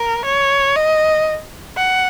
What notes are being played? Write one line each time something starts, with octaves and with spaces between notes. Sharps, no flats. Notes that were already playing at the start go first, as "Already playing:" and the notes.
Already playing: A#4
C#5
D#5
F#5